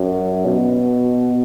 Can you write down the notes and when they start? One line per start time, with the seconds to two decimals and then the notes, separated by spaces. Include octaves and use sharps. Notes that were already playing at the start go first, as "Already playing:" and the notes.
Already playing: F#2
0.46 B2